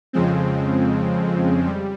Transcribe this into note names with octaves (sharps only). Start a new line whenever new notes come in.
F2 C#3 F3 G#3 C4
G3